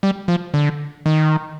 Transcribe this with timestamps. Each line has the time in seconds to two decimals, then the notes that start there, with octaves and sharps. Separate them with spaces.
0.03 G3
0.28 F3
0.54 D3
1.06 D#3